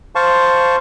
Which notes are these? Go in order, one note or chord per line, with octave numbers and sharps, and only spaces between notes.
C5 F5 A5 C#6